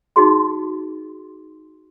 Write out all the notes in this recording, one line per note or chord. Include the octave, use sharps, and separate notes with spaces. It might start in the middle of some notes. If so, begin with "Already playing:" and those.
D#4 F#4 G#4 C6